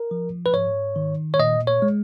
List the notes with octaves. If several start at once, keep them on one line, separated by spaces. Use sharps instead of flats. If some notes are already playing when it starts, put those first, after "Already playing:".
Already playing: A#4
F3
B4
G#2 C#5
D#3
C#5
A#2 D#5
C#5
G#3